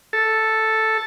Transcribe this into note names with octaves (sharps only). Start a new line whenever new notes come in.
A4